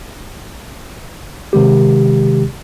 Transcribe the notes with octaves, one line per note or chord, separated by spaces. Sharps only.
C3 D#3 G#3 G4